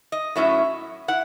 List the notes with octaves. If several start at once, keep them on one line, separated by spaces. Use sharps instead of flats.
D#5
A2 F#3 C#4 E4 E5
E4 F#5